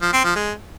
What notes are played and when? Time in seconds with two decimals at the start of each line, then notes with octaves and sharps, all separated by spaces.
0.02 F3
0.13 C4
0.24 F3
0.35 G#3